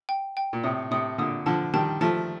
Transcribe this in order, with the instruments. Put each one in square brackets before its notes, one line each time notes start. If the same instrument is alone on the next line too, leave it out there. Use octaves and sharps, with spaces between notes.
[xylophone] G5
G5
[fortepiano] A#2
[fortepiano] A2 C3 [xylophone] D#6
[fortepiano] A2 C3 [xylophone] D#6
[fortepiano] A#2 D3 [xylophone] D#6
[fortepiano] D3 F3 [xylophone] A5
[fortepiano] D#3 G3 [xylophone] A5
[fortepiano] F3 A3 [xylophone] A5